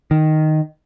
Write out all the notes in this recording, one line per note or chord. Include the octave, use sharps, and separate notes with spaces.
D#3